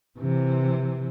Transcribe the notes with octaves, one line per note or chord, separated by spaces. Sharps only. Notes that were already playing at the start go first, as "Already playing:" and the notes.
C3 E3